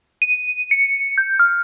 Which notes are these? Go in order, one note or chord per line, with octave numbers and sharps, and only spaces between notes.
D#7
C#7
G6
F6